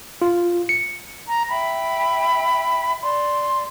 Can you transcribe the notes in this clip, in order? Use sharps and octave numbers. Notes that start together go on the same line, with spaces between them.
F4
C#7
A#5
E5 G5 B5
D5 C6